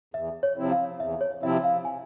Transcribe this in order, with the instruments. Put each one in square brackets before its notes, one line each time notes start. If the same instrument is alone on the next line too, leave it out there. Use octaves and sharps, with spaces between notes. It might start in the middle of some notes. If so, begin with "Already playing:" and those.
[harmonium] E2 [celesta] E5
[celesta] C#5
[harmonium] C3 F3 C4 E4
[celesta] F5
[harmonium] E2 [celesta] E5
[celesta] C#5
[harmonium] C3 F3 C4 E4 [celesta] E5
[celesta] F5
G#5